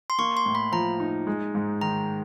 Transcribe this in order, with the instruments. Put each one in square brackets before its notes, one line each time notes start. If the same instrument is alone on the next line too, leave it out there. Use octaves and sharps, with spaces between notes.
[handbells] C6
[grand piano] A#3 [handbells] C#6
[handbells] C6
[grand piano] A2
[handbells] B5
[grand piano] F3 [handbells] A#5
[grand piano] D#4
G#3
G#2
[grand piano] D#3 [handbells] A#5